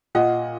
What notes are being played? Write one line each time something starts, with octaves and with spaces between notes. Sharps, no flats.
A#2 D#5 F#5